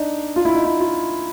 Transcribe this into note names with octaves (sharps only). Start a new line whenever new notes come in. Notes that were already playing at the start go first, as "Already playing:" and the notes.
Already playing: D4 D#4
F4
E4
D#4
E4
F4